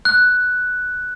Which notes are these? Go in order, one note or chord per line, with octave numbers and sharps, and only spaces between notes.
F#6